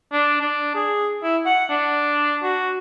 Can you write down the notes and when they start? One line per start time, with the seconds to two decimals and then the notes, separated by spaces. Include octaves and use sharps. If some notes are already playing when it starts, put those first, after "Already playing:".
0.12 D4
0.41 D4
0.75 G#4
1.23 E4
1.46 F#5
1.70 D4
2.43 F#4